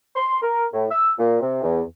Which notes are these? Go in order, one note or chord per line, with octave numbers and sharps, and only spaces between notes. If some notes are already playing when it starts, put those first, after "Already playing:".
C6
A#4
A2
E6
A#2
C3
E2